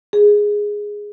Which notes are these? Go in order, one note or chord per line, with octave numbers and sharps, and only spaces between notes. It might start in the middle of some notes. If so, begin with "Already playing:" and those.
G#4